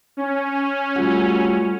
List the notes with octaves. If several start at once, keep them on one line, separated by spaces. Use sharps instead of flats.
C#4
G3 A3 F4 F#4